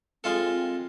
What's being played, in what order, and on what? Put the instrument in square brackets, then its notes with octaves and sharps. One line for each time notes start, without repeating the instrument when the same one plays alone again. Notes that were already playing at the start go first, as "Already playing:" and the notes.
[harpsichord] G#3 F4 A4 [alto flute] C4